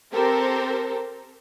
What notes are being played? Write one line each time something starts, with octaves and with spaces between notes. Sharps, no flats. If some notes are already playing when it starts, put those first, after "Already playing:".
C4 G4 A4 A#4 C5